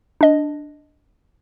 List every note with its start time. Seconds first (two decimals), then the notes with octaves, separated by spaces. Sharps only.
0.21 D4 D#5